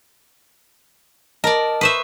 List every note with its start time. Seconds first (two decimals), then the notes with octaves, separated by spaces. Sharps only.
1.44 A#4 D5 D#5 A5
1.81 B4 C5 E5 C#6 D#6